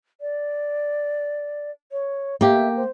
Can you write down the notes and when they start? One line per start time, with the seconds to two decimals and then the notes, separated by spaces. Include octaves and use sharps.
0.21 D5
1.92 C#5
2.41 A#3 G4 E5
2.76 C5